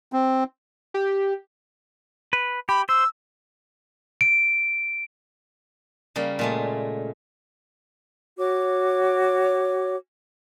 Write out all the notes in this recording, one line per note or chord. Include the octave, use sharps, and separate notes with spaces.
C4
G4
B4
G4 B5
C5 E6
D7
C#3 G3 A#3
A#2 G#3 A3
F#4 C#5 D6